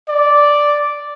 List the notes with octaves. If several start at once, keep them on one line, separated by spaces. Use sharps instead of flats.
D5